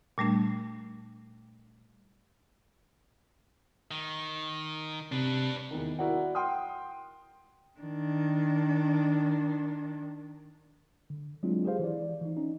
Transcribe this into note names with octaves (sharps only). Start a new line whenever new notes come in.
A#2 G3 A3 D4
D#3
C3 D4 B4
E2 D#3
E4 F#4 A#4 D5 F#5
F#5 G5 C6 D#6 F6
D#3 D4
D3
F#3 G#3 C4 D4 E4 F4
G4 G#4 B4 C5 F5
E3 E4 D5
E3 D#4
C#4 D#4